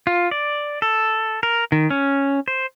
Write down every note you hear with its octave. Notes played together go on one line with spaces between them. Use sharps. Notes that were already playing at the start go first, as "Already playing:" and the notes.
F4
D5
A4
A#4
D#3
C#4
C5